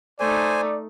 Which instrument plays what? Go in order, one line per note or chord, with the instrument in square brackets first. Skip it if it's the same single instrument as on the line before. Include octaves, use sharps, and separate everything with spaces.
[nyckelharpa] A3 D#4 [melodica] C5 G#5 [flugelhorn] D5